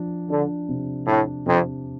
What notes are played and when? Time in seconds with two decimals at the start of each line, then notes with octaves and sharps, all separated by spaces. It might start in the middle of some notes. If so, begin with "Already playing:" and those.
Already playing: F3 D4
0.30 D3 D4
0.69 C3
1.07 A2 D4
1.46 F2 C3